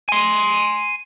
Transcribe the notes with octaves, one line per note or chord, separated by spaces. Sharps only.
G#5 C6